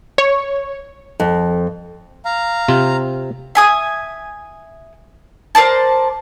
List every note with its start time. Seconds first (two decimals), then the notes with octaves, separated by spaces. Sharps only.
0.18 C#5
1.20 F2
2.25 F5 A#5
2.68 C3 C4 F4
3.55 E5 G#5 D#6
5.55 A#4 C5 D5 A5